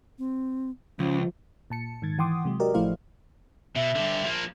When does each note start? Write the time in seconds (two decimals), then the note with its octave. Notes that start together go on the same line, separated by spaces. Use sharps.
0.19 C4
0.99 C#2 F3 C#4
1.70 A#2 A5 C#7
2.02 G#2 D#3 G#6 A6
2.18 E3 F#5 G5 C6 D6 D#6
2.45 C3 F#3 G#3
2.60 F#4 G4 A#4 D5 D#5
2.74 A1 F3 A3 E4 C5 F5
3.76 B2 E5
3.95 G2 D3
4.24 F3 A#3